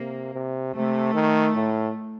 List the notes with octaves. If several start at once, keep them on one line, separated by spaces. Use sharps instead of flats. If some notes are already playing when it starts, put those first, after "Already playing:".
Already playing: C3 A#3
C3
C3 A3
D#3
A2